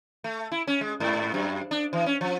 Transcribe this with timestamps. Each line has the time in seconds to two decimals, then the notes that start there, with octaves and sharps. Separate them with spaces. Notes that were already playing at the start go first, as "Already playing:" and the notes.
0.24 A3
0.52 E4
0.67 C#4
0.81 G#3
1.00 G#2
1.34 F#2
1.71 D4
1.93 E3
2.06 C#4
2.21 F3